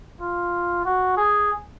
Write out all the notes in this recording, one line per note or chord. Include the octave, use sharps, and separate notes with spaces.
F4
F#4
G#4